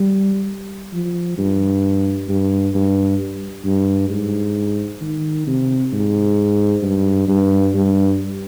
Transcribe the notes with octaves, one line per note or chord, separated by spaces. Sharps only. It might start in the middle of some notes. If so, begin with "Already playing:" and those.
Already playing: G3
F3
G2
G2
G2
G2
G#2
D#3
C3
G#2
G2
G2
G2